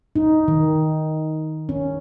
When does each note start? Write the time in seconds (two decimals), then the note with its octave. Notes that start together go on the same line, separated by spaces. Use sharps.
0.16 D#4
0.48 D#3
1.69 C#4